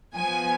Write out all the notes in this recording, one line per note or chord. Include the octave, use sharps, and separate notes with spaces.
F3 B3 G#5